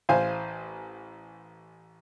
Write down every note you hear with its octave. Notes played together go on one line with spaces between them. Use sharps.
A1 C5 F5 G#5